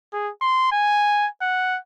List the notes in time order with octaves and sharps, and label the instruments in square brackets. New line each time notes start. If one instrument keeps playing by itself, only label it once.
[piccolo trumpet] G#4
C6
G#5
F#5